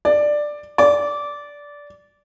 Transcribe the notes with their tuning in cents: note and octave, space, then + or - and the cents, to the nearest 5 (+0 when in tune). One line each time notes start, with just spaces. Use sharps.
D5 +10
D5 -15